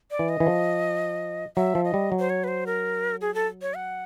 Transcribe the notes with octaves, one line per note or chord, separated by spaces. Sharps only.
D5
E3
D#5
E3
F3
F#3 E5
F3
D#5
G3
F#3
C5
C#5
B4
C5
A#4
G#4
A4
C#5
F#5